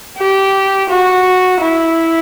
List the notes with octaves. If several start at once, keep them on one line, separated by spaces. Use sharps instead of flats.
G4
F#4
E4